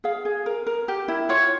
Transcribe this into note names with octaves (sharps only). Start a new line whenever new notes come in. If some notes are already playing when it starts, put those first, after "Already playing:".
G#4 F5
G#4
A#4
A#4
G4
E4
F4 C#5